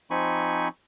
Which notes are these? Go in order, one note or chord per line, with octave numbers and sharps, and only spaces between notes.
F3 C4 D#4 G#5 B5 C#6